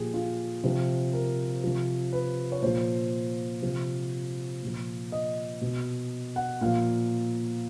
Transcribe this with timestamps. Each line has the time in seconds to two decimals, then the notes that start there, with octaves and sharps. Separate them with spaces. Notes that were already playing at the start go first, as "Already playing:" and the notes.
Already playing: A#2 F3 G4 G#4
0.14 F4
0.64 C3 F3
1.13 A#4
1.64 C3 F3
2.13 B4
2.52 C#5
2.62 A#2 F3 C5
3.62 C3 F3
4.63 A#2 F3
5.12 D#5
5.61 B2
6.36 F#5
6.61 A#2 F3 F5